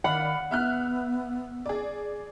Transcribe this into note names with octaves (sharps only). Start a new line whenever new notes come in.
D#3 D5 F5 F#5 B5
B3 E5 F6 F#6
G#4 D5